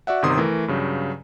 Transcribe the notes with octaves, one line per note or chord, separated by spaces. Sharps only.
F#4 D5 E5 F#5
G1 C3 D#3 C6 D#6
E3 A3 A#4
G2 C#3 F#3